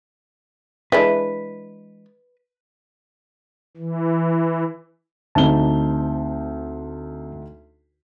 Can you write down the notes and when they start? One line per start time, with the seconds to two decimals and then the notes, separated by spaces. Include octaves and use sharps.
0.92 E3 G#3 D4 B4
3.77 E3
5.35 D2 C4 D#4 A5 G7